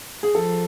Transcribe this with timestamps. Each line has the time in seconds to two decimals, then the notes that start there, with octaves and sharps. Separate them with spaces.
0.23 G#4
0.35 F3 A4